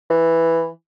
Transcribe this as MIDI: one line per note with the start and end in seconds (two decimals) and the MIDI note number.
0.10 0.67 52